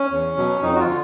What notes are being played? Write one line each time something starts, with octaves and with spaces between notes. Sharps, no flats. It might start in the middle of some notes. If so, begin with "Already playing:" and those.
Already playing: C#4
E2
B2 F#3
F2 D#4
F#4
F4
D3